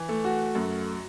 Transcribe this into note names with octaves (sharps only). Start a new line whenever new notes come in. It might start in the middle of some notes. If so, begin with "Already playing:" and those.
Already playing: E3
A3
F#4
F#2